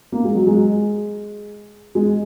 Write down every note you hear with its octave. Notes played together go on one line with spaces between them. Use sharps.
A#3
G#3
F#3
G#3
G#3